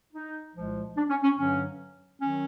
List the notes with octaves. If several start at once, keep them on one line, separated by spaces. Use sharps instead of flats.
D#4
C2 A#2 F3 G#3
D4
C#4
C#4
G2 D3 F#3 C#4
D#3 F#3 C#4